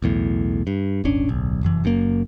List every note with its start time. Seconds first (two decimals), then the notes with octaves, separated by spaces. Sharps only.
0.02 B1 E2 A2
0.67 G2
1.05 D#1 G#1 C#4 D4
1.29 D1 B1
1.63 F1 F#2 E3
1.84 F#1 F#2 D#3 A#3